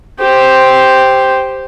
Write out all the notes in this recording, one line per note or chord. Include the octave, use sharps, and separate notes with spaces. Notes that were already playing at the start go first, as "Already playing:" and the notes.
G4 C5